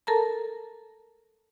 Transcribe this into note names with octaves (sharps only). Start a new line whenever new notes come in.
A4 A#4 A5 A#5